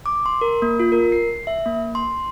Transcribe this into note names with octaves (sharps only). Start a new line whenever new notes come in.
D6
C6
A#4
A#3
F4
A#4
C7
E5
A#3
C6